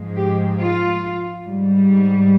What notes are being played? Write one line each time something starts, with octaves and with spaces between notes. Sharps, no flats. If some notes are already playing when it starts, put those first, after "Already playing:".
Already playing: G#2 F3 G#3
G4
F4
G#2 G3